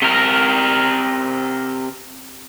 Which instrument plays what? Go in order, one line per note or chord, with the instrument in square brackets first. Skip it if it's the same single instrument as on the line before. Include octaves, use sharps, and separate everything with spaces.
[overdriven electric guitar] C3 A#4